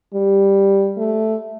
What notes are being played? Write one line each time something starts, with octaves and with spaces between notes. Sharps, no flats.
G3
A3